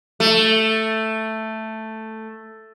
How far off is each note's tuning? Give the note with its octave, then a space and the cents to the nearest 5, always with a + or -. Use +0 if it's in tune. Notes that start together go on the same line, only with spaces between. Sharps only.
A3 +5